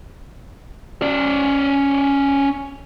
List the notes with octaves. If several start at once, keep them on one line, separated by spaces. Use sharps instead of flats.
C#4 D5